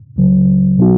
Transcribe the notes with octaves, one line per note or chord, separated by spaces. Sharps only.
C#2 C#3 F#3
B2 F#3 B3 D#4 F#4